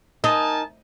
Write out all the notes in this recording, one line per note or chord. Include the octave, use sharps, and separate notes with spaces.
D#4 A#4 G#5 A5